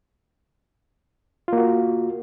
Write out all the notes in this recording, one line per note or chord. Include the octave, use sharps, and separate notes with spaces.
A#3 F4 F#4